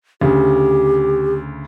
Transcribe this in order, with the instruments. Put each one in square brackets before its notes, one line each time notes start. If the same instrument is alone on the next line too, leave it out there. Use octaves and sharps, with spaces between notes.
[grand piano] D2 C#3 [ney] G4